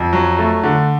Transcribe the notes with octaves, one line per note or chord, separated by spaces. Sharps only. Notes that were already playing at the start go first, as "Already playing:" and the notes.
Already playing: F2
F#3
A3
D3